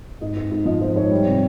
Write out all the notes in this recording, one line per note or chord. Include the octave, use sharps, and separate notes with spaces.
G#2 D#5
G#2
G#2
F3 D#5
F3 C5
G#2 C#5
G3
C3